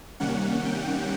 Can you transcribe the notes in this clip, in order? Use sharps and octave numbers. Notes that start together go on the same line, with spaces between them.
C3 D#3 G3 A#3 C#4 F#5
G5